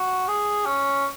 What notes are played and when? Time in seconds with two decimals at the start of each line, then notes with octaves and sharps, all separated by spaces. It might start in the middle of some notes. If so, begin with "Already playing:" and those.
Already playing: F#4
0.28 G#4
0.66 C#4